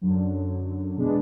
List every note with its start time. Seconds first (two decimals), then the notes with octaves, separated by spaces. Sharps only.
0.01 F#2 D3 F#3
0.96 E2 B2 G#3 B3 D4